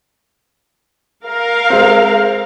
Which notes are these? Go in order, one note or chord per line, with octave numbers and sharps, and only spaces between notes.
A#4 F5
G#3 C4